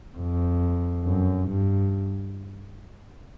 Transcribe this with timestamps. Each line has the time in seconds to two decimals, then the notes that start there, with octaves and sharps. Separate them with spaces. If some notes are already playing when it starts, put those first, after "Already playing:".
0.17 F2
1.05 F#2
1.50 G2